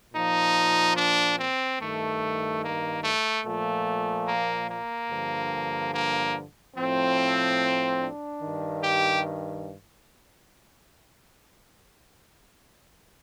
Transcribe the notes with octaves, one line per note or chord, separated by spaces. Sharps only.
A#2 F3 D#4
D4
C4
G2 D#3 A3
A#3
A3
A#2 F3 A3
A#3
A#3
G2 D3 F3
A#3
A2 F3 C4
D4
G2 D#3
G4